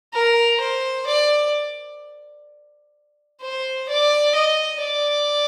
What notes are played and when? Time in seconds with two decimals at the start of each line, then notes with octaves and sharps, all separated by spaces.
0.14 A#4
0.61 C5
1.07 D5
3.42 C5
3.89 D5
4.36 D#5
4.83 D5